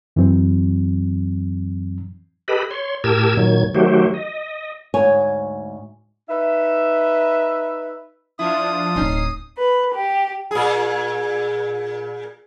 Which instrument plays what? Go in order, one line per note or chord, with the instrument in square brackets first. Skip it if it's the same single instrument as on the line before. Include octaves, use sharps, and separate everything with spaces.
[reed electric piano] F#2 E3 F#3 C4
[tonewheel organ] G4 A4 B4 D#5 B5
C#5 C6
A2 G4 A#4 A5 E6 G#6
A#2 D#3 F#3 G#6
D#3 F#3 A3 F#4 G4 C5
D#5
[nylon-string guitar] D2 G#2 C#5 G#5
[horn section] D#4 B4 E5
[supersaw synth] F3 D4 F4 [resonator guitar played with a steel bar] E4 [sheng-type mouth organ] D#6
[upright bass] D1 C4 [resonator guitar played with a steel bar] C#4 D#4 [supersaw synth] C7
[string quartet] B4
G4
[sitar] A#2 G#4